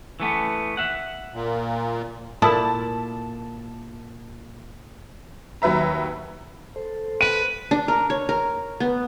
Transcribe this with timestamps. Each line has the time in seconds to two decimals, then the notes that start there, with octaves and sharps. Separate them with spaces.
0.20 E3 A3 B3
0.77 E5 F#5
1.34 A#2
2.42 A#2 E4 A4 A#4 A5
5.62 D#2 F#3 B4 E5 A#5
6.76 A4 C5
7.21 B4 D#7
7.71 D4
7.88 A#4
8.10 C#5
8.29 A#4
8.80 B3